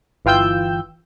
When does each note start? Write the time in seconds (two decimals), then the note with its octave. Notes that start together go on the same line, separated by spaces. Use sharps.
0.25 G1 E3 F4 G5 E6 G6